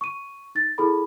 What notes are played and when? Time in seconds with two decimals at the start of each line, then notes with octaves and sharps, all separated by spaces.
0.01 C#6 D#7
0.55 D#4 A6
0.78 E4 G#4 A4 B5